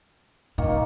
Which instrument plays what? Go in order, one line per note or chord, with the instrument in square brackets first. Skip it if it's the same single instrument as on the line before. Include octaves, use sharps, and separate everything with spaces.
[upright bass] A#2 [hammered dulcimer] D#3 A#3 C#6